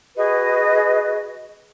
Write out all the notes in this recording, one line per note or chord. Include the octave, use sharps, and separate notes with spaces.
F#4 G#4 B4 D#5